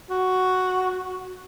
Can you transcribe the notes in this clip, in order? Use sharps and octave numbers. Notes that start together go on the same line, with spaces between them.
F#4